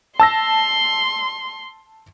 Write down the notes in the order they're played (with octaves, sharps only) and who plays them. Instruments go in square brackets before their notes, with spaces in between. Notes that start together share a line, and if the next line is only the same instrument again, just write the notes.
[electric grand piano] A5 E6 A#6 [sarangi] C6